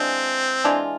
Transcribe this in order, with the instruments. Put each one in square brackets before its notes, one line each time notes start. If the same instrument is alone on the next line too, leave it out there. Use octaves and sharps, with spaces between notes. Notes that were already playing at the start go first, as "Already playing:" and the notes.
Already playing: [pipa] E3 G#3 D4 F4 [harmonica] C4
[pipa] E3 G#3 D4 F4